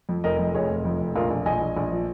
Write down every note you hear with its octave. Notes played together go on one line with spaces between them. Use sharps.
F2
F1 A#4 D#5
F2
F1 G#4 C#5
F1
F2
F1
A#1 F4 A#4
A#1
A#1 D#5 G#5
A#1
A#1
F3